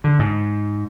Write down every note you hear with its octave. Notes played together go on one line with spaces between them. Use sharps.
D3
G#2